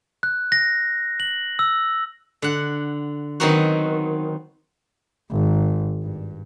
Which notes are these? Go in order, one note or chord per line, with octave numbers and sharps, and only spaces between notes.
F#6
A#6
F#7
E6
D3 F#5
D#3 F#3 B3 C4 D#4 F#4
G#1
G2